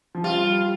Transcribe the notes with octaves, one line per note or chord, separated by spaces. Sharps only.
F3
G3 F4